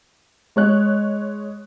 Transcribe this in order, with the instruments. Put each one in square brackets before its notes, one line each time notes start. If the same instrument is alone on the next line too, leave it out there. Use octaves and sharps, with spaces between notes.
[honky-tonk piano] G#3 C#5 F#6